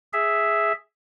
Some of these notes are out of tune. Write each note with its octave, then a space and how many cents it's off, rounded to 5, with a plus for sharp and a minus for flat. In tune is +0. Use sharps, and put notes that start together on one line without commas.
G#4 +0 E5 +0